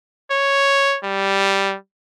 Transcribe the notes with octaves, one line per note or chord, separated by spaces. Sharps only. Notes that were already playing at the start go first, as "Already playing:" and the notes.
C#5
G3